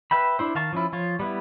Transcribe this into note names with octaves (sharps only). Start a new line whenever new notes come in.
B4 E5 G5 B5
D4 E4 C5
D#3 F5 A5 C#6
F3 C#4 E4
F3 F4 C#5
G3 B3 E4